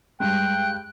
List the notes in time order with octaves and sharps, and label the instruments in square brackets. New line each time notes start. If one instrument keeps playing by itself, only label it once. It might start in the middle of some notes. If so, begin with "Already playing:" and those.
[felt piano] G2 G#3 [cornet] G5 [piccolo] F#6